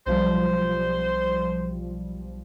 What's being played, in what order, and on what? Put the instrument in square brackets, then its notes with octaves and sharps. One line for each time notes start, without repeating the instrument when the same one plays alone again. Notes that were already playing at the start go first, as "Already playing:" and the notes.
[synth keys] B1 F3 G3 [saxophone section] C5